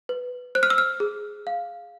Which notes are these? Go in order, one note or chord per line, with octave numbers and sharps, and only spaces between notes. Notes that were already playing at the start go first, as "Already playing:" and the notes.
B4
C5 F#6
F6
E6
F6
G#4
F5